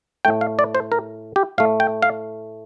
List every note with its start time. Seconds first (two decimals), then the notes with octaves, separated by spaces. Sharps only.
0.25 A2 A3 G5
0.41 F5
0.59 D5
0.75 C5
0.92 A#4
1.36 G4
1.58 A2 A3 F5
1.80 G5
2.02 F5